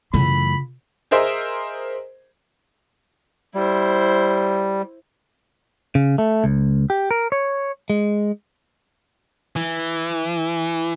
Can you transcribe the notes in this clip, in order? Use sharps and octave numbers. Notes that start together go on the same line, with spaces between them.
F#2 C#3 E3 A3 F4 B5
G#4 A#4 C5 D#5 E5
G3 E4 C5
C#3
A3
C#2
G4
A#4
C#5
G#3
E3